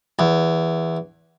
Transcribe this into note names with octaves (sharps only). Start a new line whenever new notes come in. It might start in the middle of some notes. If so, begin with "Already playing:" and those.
E2